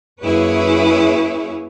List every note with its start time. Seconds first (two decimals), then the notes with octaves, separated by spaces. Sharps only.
0.21 F#2 A#3 E4 G#4 B4 C#5